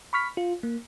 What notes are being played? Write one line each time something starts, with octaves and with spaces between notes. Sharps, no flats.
B5 C#6 F6 B6
F4
A#3